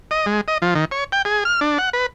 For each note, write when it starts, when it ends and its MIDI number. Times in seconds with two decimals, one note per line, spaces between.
0.11 0.26 75
0.26 0.41 56
0.48 0.58 75
0.62 0.74 53
0.75 0.85 51
0.91 1.04 73
1.12 1.22 79
1.25 1.44 68
1.45 1.60 89
1.61 1.78 62
1.78 1.90 78
1.93 2.06 71